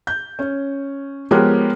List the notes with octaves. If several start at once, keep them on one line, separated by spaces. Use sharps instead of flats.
G6
C#4
F3 G#3 B3 G4 A#4 C#5